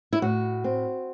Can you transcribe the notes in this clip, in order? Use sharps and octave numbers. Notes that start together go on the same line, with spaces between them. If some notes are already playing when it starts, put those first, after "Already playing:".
E4
A2 F#4
C4